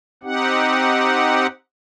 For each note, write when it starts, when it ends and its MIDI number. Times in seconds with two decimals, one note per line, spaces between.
0.23 1.47 60
0.23 1.47 63
0.23 1.47 67
0.23 1.47 78